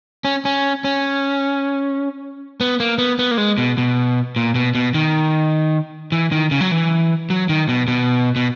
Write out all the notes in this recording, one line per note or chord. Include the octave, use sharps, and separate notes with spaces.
C#4
C#4
C#4
B3
A#3
B3
B3
A#3
G#3
B2
B2
A#2
B2
B2
D#3
E3
D#3
C#3
F#3
E3
F#3
D#3
B2
B2
B2